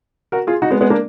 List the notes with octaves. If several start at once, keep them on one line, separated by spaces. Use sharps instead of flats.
F#4 A#4
F4 G#4
D#4 F#4
G#3 B3
G#3 B3
A#3 D4